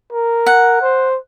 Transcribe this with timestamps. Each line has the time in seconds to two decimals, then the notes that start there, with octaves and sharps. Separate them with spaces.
0.12 A#4
0.46 F#5
0.82 C5